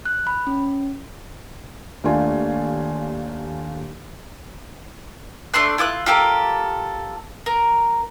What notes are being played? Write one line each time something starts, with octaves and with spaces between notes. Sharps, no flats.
F#6
B5
C#4
D#2 A3 A#3 D4 F4 G#5
A3 D4 C6 F#6
E4 F4 D6 F#6
F4 G4 A4 A#4
A#4